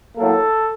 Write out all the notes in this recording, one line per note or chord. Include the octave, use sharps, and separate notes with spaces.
A2 F#3 A#3 A4